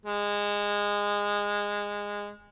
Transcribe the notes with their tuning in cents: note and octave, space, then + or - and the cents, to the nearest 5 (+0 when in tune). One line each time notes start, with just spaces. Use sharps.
G#3 -20